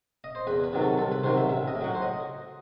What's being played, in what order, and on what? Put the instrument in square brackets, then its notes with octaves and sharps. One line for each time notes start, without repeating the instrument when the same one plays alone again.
[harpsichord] D#5
C5
E2 B4
B4
C3 D#3 F#3
A4
C2 A4
B4
C3 D#3 F#3 C5
E5
A1 E5
D#5
A2
F#3 F#5
C5
D#5